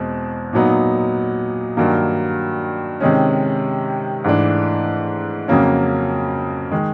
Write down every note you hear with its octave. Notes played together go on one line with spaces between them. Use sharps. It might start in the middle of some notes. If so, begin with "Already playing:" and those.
Already playing: E2 B2 G#3 C4
A#2 F#3 B3 D#4
G2 D#3 F#3 A#3
C3 D#3 G#3 C#4
G#2 E3 A3 D4
F2 C#3 F#3 A#3 C#4
D#3 G#3